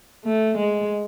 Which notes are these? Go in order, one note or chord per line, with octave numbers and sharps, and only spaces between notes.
A3
G#3